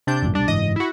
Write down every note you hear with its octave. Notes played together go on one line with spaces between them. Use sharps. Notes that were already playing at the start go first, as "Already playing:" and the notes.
C3 D4 G6
G#1 F#2 A#2
B1 F#2 G3 D4
F#1 G#2 E3 D#5
E4 F#4